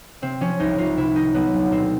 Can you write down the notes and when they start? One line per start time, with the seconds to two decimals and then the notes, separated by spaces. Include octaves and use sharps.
0.22 C3 C4
0.40 F3 C#4
0.60 C2 D#4
0.78 C2 F4
0.97 C3 E4
1.16 D#3 D#4
1.34 F#3 B3
1.54 D2
1.72 B2 C4